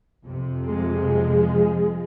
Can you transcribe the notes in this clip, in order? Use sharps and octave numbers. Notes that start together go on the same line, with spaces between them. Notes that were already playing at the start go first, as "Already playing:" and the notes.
F2 C3
F3 G#3